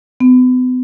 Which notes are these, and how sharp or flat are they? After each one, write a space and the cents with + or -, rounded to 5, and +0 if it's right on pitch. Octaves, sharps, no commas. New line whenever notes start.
B3 +40